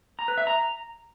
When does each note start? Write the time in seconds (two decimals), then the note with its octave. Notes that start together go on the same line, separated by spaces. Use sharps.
0.19 A#5
0.28 B4
0.38 E5
0.47 A#5